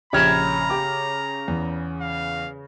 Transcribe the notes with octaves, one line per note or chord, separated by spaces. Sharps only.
A#1 C#3 G4 C#5 A#5 B5 F6
G4 D6
E2
F5